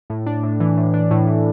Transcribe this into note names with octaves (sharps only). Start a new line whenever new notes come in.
A2
D4
A2
E3
A2
D4
A2
E3